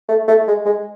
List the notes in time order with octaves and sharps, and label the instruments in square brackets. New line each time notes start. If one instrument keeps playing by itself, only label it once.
[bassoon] A3
A3
G#3
G#3